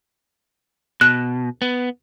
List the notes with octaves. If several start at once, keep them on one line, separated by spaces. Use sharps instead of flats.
B2 F#6
B3